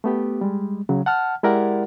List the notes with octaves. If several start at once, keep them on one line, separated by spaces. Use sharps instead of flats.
A3 B3 G4
G3 G#3
C#3 F#3
F#5 A5 F6
G#3 E4 G4 A#4 D5 F#5